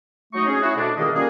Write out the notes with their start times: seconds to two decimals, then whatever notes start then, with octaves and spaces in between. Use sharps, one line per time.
0.34 F#3 A3 D#4 C#6
0.48 C#4 G#4
0.63 E4 F#4
0.76 D2 B2 D4
0.97 C#2 D#3 A#3 D#5
1.15 G3 A#3 C#4 F4 G#4